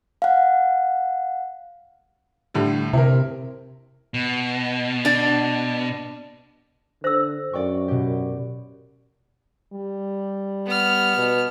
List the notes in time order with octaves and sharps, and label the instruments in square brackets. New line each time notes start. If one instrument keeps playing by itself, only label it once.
[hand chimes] F5 F#5
[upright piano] A2 D3 G3
[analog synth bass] C3 [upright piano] E4 A#4
[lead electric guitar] B2
[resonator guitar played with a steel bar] D4 D5
[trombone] D3 [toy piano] C5 E6 [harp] A#6
[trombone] F#2 [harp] D5 G5 C#6
[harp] B2 G4
[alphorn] G3
[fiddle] B3 F6
[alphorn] B2